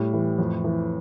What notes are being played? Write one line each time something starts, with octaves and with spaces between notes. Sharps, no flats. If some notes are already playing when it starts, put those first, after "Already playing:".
Already playing: A2 G3
E3
F2
E3